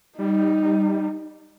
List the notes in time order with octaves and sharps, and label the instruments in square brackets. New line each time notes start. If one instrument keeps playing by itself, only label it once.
[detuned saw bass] G3 [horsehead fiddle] D#4